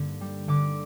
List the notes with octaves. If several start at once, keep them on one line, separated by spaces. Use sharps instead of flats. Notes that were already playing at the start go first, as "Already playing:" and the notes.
Already playing: G2 D3 A#3
G3
D3 D6